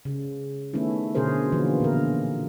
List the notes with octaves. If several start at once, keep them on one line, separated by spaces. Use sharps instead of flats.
C#3
D#3 A3 B3 C#4 E4
B2 D3 C#4 G#4 A#4 C5
D3 E3 F3 A#3 B3 C#4
A#2 D3 A#4